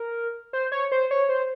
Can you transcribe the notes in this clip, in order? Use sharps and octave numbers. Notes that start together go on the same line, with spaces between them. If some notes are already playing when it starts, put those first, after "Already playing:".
Already playing: A#4
C5
C#5
C5
C#5
C5